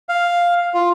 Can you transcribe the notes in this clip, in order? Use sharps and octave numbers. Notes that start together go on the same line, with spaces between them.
F5
F4